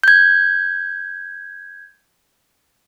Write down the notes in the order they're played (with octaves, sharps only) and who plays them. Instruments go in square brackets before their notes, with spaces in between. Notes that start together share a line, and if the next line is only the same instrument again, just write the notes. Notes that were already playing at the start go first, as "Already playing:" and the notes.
[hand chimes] G6 G#6